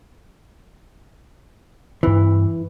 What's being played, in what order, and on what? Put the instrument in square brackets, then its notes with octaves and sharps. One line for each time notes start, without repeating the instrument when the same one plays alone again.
[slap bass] G2 C4 [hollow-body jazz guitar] E3